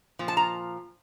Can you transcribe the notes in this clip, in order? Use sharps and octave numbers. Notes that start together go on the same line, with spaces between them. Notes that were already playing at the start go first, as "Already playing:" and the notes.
A#2 F3
A5
A#5